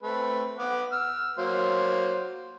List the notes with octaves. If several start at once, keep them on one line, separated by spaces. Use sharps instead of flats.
A3 C4 B4
B3 F#5 D6
E6 F6
F#3 A#3 C5